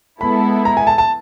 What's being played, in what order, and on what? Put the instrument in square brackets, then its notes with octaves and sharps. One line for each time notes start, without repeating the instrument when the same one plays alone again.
[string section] G#3 B3 E4 A4 [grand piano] B5
[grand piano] A#5
G#5
A5
A5